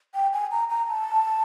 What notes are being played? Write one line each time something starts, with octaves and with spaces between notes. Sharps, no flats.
G5
G#5
A#5
A#5
A5